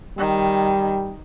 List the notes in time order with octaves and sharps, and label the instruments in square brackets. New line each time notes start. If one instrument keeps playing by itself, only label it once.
[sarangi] D#3 [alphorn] G3